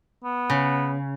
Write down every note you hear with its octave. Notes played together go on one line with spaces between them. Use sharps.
B3
C#3